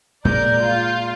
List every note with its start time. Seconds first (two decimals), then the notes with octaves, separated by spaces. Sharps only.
0.25 A#2 G#3 A#4 D5 G6
0.61 F4